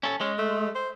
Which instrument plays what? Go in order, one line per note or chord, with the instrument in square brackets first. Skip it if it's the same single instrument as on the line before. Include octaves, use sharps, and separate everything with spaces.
[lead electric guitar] C#4 A4
[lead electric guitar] G#3 [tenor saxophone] C#4
[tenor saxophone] A3
C5